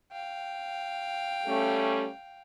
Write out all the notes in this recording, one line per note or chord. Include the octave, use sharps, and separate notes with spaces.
F5 G5
G3 A3 C#4